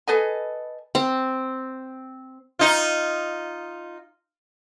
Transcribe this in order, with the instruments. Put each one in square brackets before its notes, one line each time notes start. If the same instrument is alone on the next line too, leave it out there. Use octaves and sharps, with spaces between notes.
[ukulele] A4 B4 D#5 G#5
[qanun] C4
[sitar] D#4 F4